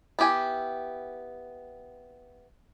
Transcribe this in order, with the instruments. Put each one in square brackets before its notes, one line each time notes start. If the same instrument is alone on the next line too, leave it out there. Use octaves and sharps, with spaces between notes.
[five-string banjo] B3 E4 G4 G#5